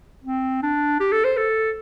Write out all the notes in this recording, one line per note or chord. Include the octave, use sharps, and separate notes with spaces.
C4
D4
G4
A4
C5
A4